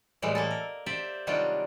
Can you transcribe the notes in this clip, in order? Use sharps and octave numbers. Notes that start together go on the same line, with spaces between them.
A2 E3 G3 G#3
A#3 A4
A#4
G4 C5 D5 E5
C3 D#3 F#3 G3 D4 F4